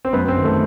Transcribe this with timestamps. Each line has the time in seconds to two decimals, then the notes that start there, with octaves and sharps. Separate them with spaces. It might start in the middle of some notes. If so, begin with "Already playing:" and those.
0.05 C4
0.13 F#2 B3
0.28 C4
0.36 D#3
0.44 A3